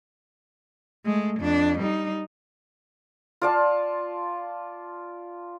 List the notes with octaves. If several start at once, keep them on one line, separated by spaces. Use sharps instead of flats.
G#3 A3
F2 D4
G3 D#4
F4 D5 A5